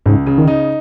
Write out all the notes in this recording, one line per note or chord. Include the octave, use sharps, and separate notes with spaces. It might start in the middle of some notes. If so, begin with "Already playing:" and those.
C#2 G#2
C#3
D#3
D#4